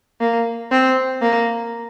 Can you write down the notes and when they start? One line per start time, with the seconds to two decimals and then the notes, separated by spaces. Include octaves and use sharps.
0.21 A#3
0.72 C4
1.22 A#3